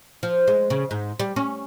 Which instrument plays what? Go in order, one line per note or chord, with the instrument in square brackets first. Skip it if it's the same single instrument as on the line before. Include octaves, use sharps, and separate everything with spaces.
[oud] F3
G#3
C#3
G#2
G3
C#4